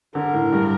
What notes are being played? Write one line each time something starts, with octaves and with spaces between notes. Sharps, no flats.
D3 A#4
A2
G2